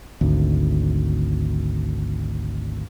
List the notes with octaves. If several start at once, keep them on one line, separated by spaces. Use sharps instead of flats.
G#1 D2